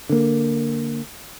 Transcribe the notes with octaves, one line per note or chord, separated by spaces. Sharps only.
D3 A#3